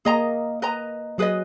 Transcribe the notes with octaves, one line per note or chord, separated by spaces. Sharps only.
A#3 G#4 D#5 A#5
B4 D#5 A#5
F#3 G#4 B4 D#5